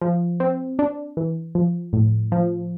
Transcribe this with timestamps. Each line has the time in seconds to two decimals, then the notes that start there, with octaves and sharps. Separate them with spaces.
0.02 F3
0.40 C4
0.79 D4
1.17 E3
1.55 F3
1.93 A2
2.32 F3